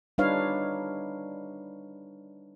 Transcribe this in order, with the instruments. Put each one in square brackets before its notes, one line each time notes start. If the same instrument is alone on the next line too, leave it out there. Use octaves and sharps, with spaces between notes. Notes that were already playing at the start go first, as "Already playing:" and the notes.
[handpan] G3 D4 D#4 B4 C#5 F5